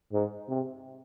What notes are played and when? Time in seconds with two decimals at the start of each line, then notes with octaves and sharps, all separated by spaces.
0.13 G#2
0.49 C3